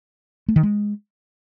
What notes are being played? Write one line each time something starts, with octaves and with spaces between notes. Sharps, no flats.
A3
D#3
G#3